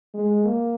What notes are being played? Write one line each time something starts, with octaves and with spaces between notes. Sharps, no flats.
G#3
A#3